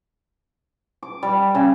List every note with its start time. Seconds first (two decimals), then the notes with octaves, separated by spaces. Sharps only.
1.03 D6
1.23 G3
1.55 C#3